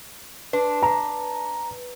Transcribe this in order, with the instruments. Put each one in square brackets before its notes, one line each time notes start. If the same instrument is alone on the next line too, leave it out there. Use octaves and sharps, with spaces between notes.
[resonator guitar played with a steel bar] D4 [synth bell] B4
[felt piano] A#5